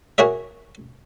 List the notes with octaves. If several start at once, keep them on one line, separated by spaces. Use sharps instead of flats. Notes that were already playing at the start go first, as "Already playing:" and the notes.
F#4 G#4 A#4 C#5 E5